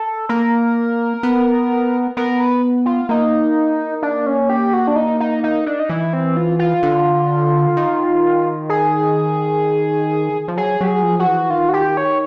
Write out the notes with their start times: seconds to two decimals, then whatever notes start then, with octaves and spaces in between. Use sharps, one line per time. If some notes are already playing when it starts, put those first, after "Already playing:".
Already playing: A4
0.29 A#3 A#4
1.23 B3
2.17 B3 A#4
2.40 B4
2.86 F4
3.09 A#3 D#4
4.02 D4
4.26 C#4
4.50 G4
4.73 F#4
4.88 D4
4.96 D#4
5.20 D#4
5.44 D#4
5.66 D4
5.80 D#4
5.89 E3 E4
6.13 C4
6.37 F4
6.59 F4
6.83 D3
7.77 D#3
8.69 G#4
10.48 F3
10.57 F#3 G#4
10.81 F#3 G4
10.87 G#4
11.03 F3
11.19 F#4
11.26 E3
11.50 D#3 F4
11.69 F#4
11.74 G4
11.97 C#5